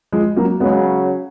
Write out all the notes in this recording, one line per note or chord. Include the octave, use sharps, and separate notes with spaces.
F3 G#3
F#3 A#3
C#3 F#3 G#3 B3